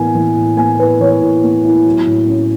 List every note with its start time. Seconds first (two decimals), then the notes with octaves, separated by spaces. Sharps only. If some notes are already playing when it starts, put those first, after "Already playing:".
Already playing: A2 E3 B3 E4 G#5
0.15 E3
0.36 A2
0.57 B3 G#5
0.79 E4 B4
1.00 E3 C#5
1.21 A2
1.43 B3
1.65 E4
1.86 F#3
2.07 A2
2.28 C#4